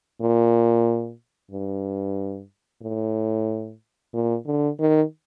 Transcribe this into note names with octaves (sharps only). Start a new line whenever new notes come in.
A#2
G2
A2
A#2
D3
D#3